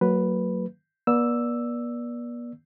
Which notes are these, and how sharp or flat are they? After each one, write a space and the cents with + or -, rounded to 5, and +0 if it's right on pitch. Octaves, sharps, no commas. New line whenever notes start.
F#3 +0 A#3 -40 B4 +0
B3 -45 D5 +0 E6 +0